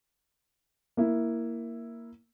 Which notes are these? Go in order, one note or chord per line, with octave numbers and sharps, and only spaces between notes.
A#3 E4